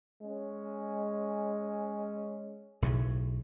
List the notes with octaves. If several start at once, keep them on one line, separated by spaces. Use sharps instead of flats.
G#3 C#4
B1 A2 C#3